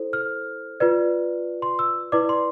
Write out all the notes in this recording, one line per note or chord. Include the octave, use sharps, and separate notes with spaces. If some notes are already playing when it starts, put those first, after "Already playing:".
Already playing: E4 A4 C5
F6
F4 B4 D5
C6
E6
E4 B4 D5 D6
C6